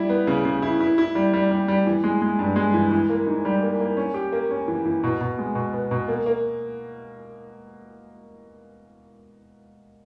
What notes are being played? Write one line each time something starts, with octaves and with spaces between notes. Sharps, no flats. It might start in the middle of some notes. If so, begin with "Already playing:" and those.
Already playing: G3 E4
B3
C#3
C#3
E4
E4
E4
G3
G3
G3
G3
E3
G#3
G#3
G2
G#3
E3
E3
A#3
G#2
G3
A#3
A#3
C#4
G4
A#3
C#4
E3
E3
B2
B2
G#3
B2
B3
B2
A#3
A#3